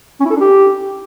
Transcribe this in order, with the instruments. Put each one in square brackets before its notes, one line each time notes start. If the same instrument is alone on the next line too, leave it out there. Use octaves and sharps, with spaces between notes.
[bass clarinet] C#4
E4
A4
D4
G4